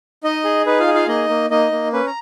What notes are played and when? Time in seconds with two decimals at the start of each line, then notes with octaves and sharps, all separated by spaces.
0.24 D#4 D#5
0.45 G#4
0.66 D#4 B4
0.80 F4 F5
0.87 G#4
0.94 F4 F5
1.08 A#3 D#4 D#5
1.29 A#3
1.50 A#3 D#4 D#5
1.72 A#3
1.93 C#4 B4
2.07 A#5